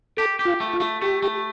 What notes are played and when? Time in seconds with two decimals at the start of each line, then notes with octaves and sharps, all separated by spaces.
0.17 G4 A4
0.39 G4
0.45 F4
0.60 A3
0.73 F4
0.80 A3
1.02 A3 G4
1.22 A3